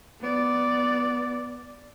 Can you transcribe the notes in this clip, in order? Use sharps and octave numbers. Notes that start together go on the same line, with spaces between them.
B3 D5